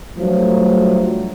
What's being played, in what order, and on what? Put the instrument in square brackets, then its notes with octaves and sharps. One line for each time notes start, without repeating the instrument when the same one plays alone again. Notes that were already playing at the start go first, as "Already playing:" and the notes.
[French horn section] G2 F3 F#3 A3